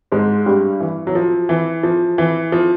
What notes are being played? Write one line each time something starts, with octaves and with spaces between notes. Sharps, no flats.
G#2 G#3
G2 G3
E3
F#3
F3
E3
F3
E3
F3